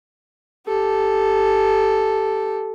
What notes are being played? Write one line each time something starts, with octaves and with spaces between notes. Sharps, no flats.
G4 A4